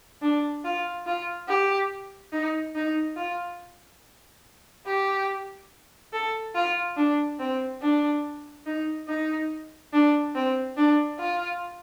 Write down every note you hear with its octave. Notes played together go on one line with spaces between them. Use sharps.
D4
F4
F4
G4
D#4
D#4
F4
G4
A4
F4
D4
C4
D4
D#4
D#4
D4
C4
D4
F4